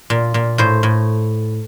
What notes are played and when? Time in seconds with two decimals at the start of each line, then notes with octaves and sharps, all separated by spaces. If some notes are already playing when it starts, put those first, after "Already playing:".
0.10 A#2
0.34 A#2
0.58 A2 C5
0.83 A2